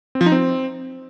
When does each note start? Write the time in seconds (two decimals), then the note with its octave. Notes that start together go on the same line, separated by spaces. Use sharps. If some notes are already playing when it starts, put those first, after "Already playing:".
0.15 C4
0.21 F3
0.26 D#4
0.32 C4